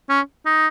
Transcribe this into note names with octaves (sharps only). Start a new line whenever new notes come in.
C#4
D#4